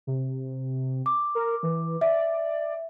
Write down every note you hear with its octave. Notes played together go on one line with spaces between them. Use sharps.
C3
D6
A#4
E3
D5 E5